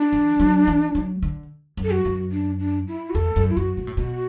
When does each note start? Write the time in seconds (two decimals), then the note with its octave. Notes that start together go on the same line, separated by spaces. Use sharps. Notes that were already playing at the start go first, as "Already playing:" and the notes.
Already playing: D4
0.13 E3
0.40 F#3
0.67 E3
0.95 F#3
1.22 D3
1.77 F#2
1.84 A4
1.91 F#4
2.05 F#2
2.32 D4
2.59 D4
2.88 E4
3.10 F#4
3.15 E2 A4
3.36 F#2
3.50 E4
3.57 F#2 F#4
3.77 B2
3.87 A2
3.97 B2 F#4